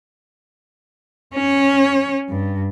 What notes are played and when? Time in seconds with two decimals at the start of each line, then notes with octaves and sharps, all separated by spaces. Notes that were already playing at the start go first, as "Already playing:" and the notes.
1.34 C#4 C#5
2.29 G2